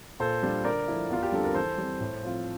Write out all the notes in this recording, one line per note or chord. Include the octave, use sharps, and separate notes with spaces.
A#2 A4 C5
G3 D4 F4
D3 A#4 D5
F3 A3 E4
E2 F4
G4
D3 G3 C4 A4
A#4
E3 A4 C5
G3 C4
A2
F3 C4 F4